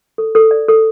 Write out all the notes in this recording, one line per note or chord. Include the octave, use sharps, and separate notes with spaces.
A4
A4
D5
A4